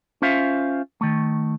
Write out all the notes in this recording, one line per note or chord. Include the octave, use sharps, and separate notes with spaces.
C#4 F4 C5 E5 F5
D#3 A3